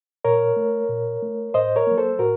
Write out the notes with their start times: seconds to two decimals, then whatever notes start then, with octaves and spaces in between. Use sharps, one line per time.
0.24 A#2 A#4 C#5
0.57 A3
0.89 A#2
1.22 A3
1.54 A2 C5 D#5
1.76 A#4 C#5
1.87 F#3 A#3
1.98 A4 C5
2.19 A2 F#4 A#4